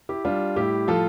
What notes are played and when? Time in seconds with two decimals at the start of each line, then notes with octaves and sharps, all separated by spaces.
0.09 E4 G4
0.25 G3 D4 F4
0.56 A2 E4 G4
0.88 F3 F4 A4